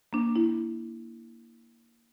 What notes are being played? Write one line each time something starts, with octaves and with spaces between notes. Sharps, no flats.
A#3 D4
E4